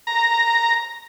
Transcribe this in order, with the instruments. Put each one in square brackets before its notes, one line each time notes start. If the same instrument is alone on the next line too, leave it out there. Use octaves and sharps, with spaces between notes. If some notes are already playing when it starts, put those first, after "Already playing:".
[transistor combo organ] A#5